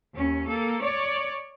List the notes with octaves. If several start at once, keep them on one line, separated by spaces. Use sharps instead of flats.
D#2 C#4
A#3 A4
C#5 D5